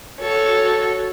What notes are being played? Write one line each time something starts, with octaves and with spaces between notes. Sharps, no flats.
F#4 A4 C#5